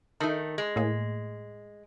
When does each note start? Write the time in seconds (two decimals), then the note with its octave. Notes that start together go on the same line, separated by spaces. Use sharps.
0.20 D#3 A3 D#4 A4
0.58 G#3
0.76 A2 A#3 G#4